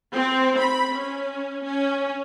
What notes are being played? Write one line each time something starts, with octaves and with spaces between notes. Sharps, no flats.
C4
B5
C#4
C#4